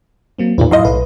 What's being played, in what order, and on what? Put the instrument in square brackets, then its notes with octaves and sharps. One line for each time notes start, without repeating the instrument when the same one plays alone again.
[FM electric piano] F#3 A#3 C4
[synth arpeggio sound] E2 A#2 [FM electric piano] D#4 F4 B4
[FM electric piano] A2 F5 C6 [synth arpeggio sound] F#3 E4 D#5
[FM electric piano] B1 B4 [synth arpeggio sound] A2